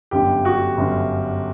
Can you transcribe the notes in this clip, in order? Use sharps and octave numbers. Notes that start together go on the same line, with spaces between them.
G1 F#2 D3 G4
F#4
G1 F#2 D3